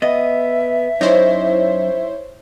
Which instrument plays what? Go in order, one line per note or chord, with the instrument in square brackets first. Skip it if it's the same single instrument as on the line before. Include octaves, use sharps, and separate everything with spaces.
[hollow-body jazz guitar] B3 D#5 [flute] E5
[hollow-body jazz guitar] F#2 D#4 [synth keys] E4 C5 C#5